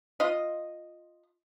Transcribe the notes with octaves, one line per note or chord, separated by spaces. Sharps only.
F4 D#5